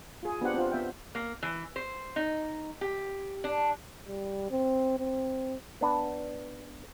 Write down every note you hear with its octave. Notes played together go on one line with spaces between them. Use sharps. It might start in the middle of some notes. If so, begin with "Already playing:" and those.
F4 G#4
B3 D4 F4 G4 C5 F#5
C4 F4
B3 E5 G5
A#3
E3
C5
D#4
G4
D4
G3
C4
C4
B3 D4 B4